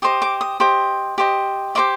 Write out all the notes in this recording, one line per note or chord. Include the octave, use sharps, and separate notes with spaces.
G4 C5 D#5 D#6
D6
D#6
G4 C5 D#5
G4 C5 D#5
G4 C5 D#5 D6